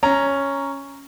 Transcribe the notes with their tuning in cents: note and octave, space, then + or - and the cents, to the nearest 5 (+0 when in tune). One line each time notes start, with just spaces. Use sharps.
C#4 +0 A#5 +0